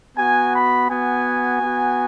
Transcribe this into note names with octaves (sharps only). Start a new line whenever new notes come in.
B3 F#4 G#5
B5
B3 F#4 G#5
B3 F#4